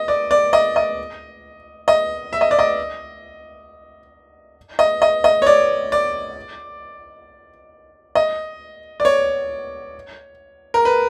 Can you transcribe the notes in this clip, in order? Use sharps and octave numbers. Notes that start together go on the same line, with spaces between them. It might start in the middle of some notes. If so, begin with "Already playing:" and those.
Already playing: D#5
D5
D5
D#5
D#5
D#5
E5
D#5
D5
D#5
D#5
D#5
D#5
C#5
D5
D5
D#5
D5
C#5
A#4
B4